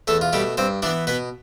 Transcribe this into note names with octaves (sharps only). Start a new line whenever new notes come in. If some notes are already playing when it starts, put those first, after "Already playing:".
E2 A3 A4
F4
B2 G3 A3 G4
G2 C4 C5
E3 B3 D4 D5
B2 B3 B4